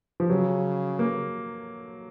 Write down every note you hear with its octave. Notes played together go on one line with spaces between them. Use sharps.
F3
C#3 F#3
A#3